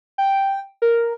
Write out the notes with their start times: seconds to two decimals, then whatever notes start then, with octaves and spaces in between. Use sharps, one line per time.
0.18 G5
0.82 A#4